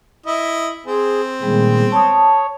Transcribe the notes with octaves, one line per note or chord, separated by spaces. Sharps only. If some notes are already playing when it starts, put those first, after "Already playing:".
E4 D#5
C4 G#4
A#2 D#3 G3 G#3 B3 G#4
C#5 A5 D#6